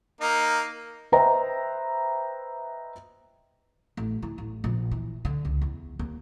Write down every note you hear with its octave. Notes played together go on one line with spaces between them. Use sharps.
A#3 D#4
B4 C5 D#5 E5 G5 A#5
A1
E3
A1
A#1
E3
D3
C#2
E2
D#2